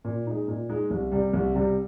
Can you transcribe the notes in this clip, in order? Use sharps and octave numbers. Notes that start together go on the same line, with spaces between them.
A#2
G#3 D#4
A#2
G#3 D#4
C2
C3 G3
C2
C3 G3